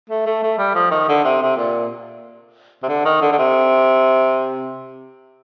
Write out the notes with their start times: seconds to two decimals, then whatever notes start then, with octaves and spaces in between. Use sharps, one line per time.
0.10 A3
0.26 A3
0.43 A3
0.59 G3
0.75 F3
0.91 D#3
1.09 D3
1.25 C3
1.42 C3
1.57 A#2
2.83 C3
2.89 D3
3.05 D#3
3.22 D3
3.32 D3
3.38 C3